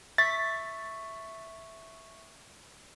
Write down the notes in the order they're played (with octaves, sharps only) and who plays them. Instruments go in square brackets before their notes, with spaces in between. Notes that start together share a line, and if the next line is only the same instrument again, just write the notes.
[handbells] E5 C#6 B6 [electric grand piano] A6